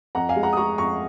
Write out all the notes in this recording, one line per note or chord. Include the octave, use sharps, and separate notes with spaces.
F2 F#5 A#5
F5 G#5
G#3
F#5 A#5
D#6
G#3 A#5 C#6
F2 A#5 C#6